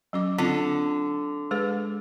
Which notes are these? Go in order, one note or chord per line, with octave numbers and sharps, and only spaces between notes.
F#3 C#4 D6
D3 C4 F4
G#3 G#4 B4